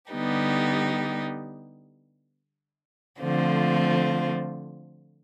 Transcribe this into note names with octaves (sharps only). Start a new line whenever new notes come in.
D3 G3 B3 D#4 G4
D3 F3 A3 C4 F4